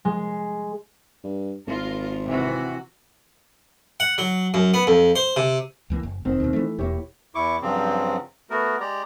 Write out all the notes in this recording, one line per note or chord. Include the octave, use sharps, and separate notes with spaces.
G#3
G2
G#1 F4 A#4
C3 E3 F#4
F#5
F#3
F#2
B3
F2
C5
C3
C#2 E3 A#3
F#1
F1 D#3 C4
D#2 B2
E3 A3
E1 E2 A#3 E4 G4 C#5
E2 E4 C#6 D6
G2 C#3 F3 F#3 C4
A3 B3 F#4 A#4
G#3 G4 D5 A#5